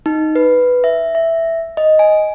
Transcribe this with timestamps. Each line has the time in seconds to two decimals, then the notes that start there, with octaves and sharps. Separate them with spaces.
0.06 D#4
0.35 B4
0.84 E5
1.15 E5
1.77 D#5
1.99 G#5